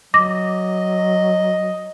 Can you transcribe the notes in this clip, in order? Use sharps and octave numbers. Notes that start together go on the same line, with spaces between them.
F#3 D#5 D6 A#6